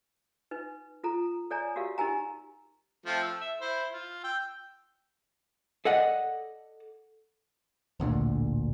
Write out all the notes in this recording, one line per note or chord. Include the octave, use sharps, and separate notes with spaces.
D#4 B4
F4 A4 A#5
A4 C#5 D5 G#5 A#5
F#4 G4 A#4 F5
D#4 G4 A#4 G#5 A#5
F3 A3 C4
E6
E5
E4 C5
F4
G5 E6
A4 D5 D#5 F#5
A1 D2 A#2 D3